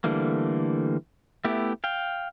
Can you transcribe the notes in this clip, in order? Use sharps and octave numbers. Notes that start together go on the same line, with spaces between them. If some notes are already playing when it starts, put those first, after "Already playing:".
D3 E3 G3 A3 A#3
A3 B3 E4 G4
F5 G5